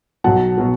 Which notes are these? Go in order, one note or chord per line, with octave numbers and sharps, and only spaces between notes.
B1 B2 F#3 F#5 A5
B2 F#3